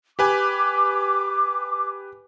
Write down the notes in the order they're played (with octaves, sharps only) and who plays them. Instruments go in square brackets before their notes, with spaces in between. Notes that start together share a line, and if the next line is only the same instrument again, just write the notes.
[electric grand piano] G4 B4 G#5 [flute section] D6